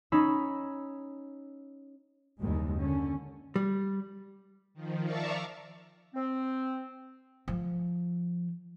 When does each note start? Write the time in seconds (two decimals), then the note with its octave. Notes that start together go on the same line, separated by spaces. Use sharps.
0.12 C#4 D#4 B5 E6
2.40 F#1 D#2 G3 G#3
2.77 D3 C#4
3.56 G3
4.74 D#3 F3
5.04 D5 E5 F5 A5 A#5 C#6
6.14 C4
7.48 F3